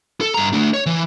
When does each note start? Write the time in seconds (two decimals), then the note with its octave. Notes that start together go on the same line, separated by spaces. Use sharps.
0.21 A4
0.34 G2 A#5
0.53 A3 D4
0.74 C#5
0.86 E3